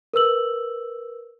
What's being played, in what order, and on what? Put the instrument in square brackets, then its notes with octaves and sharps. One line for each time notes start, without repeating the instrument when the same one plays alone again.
[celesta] A#4 B4 E6 F#7